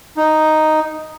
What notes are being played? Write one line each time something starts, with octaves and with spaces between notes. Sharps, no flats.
D#4